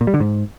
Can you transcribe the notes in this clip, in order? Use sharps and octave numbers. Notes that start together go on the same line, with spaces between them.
A#2
G3
D3
G#2